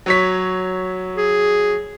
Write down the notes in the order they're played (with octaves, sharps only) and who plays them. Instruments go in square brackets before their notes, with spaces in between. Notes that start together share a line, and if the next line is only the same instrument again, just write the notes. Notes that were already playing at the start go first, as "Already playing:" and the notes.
[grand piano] F#3 C#5 B6
[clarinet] G#4